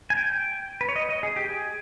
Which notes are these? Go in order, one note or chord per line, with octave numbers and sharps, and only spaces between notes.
G#5
G5
B4
C#5
D#5
D#5
G#4
G4
G#4